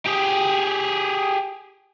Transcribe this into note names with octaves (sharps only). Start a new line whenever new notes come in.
G4 G#4